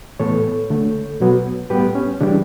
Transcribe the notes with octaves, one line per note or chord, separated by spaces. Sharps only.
A2 E3 B3 A4 C#5
D3 A3
B2 F#3 B3
A2 G3 B3 G4 B4
C#4
C#3 E3 G3 D4